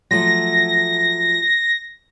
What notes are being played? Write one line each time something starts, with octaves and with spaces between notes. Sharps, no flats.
F3 F#3 A3 A#6